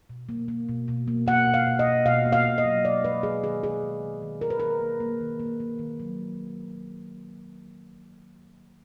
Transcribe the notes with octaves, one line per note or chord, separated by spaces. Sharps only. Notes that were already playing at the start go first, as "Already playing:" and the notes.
B2
A#3
A#3
B2
B2
A#3
A#3 F#5
B2
F5
B2
D#5
B2
B2 F5
A#3
F5
B2
D#5
F#3
G#3 D5
G#3 B4
G#3 G#4
D#3 G#4
D#3 G#4
D#3
D#3
D#3
D#3 A#4
B4
D#3 A#4
A#3
A#3
D#3
A#3
A#3
D#3
F#3